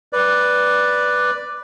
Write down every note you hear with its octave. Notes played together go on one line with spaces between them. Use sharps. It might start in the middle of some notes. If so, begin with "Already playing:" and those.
B4 D5